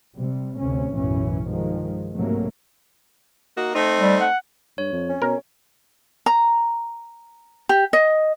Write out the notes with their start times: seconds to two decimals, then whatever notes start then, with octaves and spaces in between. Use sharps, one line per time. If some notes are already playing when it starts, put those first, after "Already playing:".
0.15 C3 G3
0.57 D2 C3 C#4
0.93 B1 F#2 A2 E3 C#4
1.48 G2 D#3 F3 G#3
2.13 C2 G#2 C3 F#3 A3 A#3
3.56 A#3 D#4 F#4
3.75 A3 C4 D#4
4.00 G3
4.22 F#5
4.78 G2 C#5
4.93 F2
5.09 C#4
5.22 B2 A#4
6.26 A#5
7.69 G4
7.93 D#5